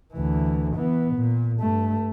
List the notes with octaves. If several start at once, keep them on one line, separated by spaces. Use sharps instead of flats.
D2 E3
E3 B3
A#2
G2 A3